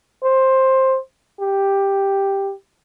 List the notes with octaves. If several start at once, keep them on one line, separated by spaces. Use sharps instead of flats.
C5
G4